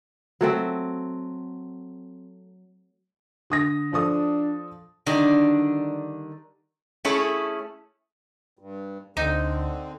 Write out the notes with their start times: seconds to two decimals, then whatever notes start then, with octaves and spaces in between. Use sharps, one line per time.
0.41 F#3 A3 C4
3.50 D3 D#6 A#6
3.93 F3 D4 A4 D#6
5.06 D3 D#3 G3 D4
7.05 A3 C#4 E4 G#4 A4 C#5
8.59 G2
9.17 D2 D3 C4 D#4